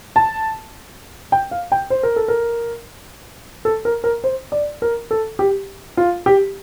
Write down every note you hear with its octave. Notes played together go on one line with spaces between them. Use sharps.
A5
G5
F5
G5
C5
A#4
A4
A#4
A4
A#4
A#4
C5
D5
A#4
A4
G4
F4
G4